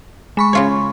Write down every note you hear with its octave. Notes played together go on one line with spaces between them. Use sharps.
G#3 B5 C#6
C#3 F4 C#5